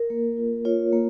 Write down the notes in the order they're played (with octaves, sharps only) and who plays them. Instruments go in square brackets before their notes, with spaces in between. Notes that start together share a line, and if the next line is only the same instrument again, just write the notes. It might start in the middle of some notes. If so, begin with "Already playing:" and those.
Already playing: [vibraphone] A#4
A#3
F4
F4 C#5
A#3